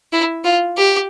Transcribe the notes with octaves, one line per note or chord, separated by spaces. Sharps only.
E4
F4
G4